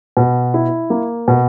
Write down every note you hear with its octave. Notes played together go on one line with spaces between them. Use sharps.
B2
E4
A#3
B2